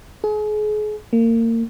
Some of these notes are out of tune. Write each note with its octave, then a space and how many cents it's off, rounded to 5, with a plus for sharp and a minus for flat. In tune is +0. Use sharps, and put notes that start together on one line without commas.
G#4 +35
A#3 -30